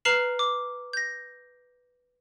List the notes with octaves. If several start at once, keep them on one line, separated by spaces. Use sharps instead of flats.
B4 A#5 F6 C7 E7 F#7
D6
G6 A#6